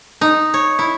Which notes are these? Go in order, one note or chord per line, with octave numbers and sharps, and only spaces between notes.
D#4
C#5
E4